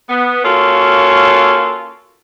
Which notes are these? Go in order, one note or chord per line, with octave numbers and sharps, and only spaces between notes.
B3
A#3 C#4 F4 F#4 A4